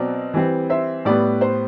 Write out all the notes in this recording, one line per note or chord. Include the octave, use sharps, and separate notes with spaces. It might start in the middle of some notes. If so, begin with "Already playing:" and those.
Already playing: B2 F#3 C4 D5
E3 G3 C4
C5 E5
A2 G3 B3 D5
C5